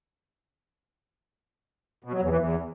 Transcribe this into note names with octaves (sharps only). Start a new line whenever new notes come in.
B2
F#3
E2
E3
E2